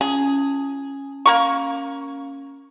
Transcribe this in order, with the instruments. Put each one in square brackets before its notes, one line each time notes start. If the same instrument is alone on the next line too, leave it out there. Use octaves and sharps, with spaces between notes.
[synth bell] C#4 [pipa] G#4
[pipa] A#3 A#4 C#6